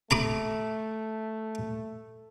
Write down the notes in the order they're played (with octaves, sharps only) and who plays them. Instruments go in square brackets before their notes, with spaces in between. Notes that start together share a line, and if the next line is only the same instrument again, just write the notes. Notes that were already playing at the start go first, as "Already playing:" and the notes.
[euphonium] A3 [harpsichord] A#5 B5 D6